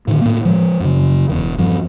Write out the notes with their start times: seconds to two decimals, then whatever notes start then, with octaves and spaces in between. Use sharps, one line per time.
0.08 A2 D3 D#3
0.21 A2 A#3
0.45 F3 G3 G#3
0.80 F#2 C#3
1.29 E1 E2 E3
1.58 G2 F3